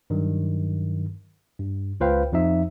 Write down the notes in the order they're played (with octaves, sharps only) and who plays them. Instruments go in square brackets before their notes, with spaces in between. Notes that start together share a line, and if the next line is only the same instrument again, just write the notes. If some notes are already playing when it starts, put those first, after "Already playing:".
[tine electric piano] G2 D#3 F#3
G2
C#2 F4 B4 C5 F5 G5
F2 F3 D#4 E5